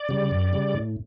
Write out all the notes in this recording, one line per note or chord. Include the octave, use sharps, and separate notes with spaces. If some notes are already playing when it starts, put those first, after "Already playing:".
Already playing: D5
C#3 G3
F#2
C#3 G3
A2